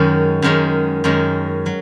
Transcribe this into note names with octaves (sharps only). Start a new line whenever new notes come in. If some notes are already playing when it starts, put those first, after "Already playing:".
Already playing: F#2 D#3 G#3 C#4
F#2 D#3 G#3 C#4
F#2 D#3 G#3 C#4
F#3